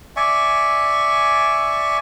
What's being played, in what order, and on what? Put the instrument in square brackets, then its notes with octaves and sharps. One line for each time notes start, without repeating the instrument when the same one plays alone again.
[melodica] D5 E5 G#5 C#6